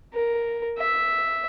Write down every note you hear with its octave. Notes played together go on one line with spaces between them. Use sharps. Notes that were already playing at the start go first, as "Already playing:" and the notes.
A#4
E5